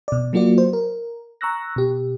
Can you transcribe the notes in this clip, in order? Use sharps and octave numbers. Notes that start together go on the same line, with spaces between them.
B2 D5
F#3 A#3 F4 F#4 D5
C5
A#4
A#5 C#6 E6 F#6 A#6
B2 G4